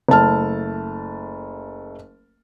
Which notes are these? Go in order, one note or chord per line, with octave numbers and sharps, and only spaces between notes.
F#1 A3 A5 F6